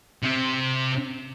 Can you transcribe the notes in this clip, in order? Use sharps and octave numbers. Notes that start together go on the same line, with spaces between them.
C3 C4